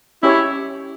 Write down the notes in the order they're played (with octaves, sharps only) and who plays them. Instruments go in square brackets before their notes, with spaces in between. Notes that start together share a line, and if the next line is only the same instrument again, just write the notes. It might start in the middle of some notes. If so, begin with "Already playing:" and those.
[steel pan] C#4 G4 C#5 [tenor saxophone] E4